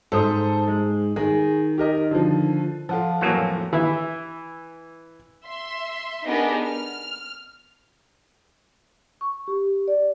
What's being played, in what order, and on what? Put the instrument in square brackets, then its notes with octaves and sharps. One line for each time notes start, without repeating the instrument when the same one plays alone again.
[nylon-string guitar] G#2 [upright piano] A4 C5 D#6
[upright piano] G#3
[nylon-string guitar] D#3 [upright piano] G#4
[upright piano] G4 A#4 D#5
D3 F3
[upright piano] F3 F4 [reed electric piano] A4 F#5 A5
[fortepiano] F2 A2 G#5 [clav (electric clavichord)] E3 F#3 A#3
[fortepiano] E3 E5
[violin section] E5 C6
B3 D4 D#4 G4 G#4 A#4
F6
[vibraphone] C#6
G4
D5